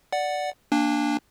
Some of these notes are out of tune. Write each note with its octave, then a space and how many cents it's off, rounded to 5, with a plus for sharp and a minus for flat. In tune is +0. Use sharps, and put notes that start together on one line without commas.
D5 +0 F#5 +0
A#3 +0 D4 +0 G#5 -45